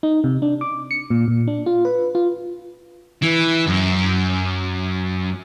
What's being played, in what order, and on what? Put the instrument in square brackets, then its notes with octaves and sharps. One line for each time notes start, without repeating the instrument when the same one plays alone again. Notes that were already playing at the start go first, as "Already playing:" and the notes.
[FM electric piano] D#4
C3
D4
D6
C#7
A#2
A#2
D4
F4
B4
F4
[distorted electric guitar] E3
F#2